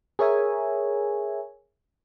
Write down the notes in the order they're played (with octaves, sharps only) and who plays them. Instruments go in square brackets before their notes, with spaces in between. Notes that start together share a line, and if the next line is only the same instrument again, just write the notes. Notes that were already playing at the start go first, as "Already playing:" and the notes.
[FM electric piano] G#4 A#4 C#5 E5 G#5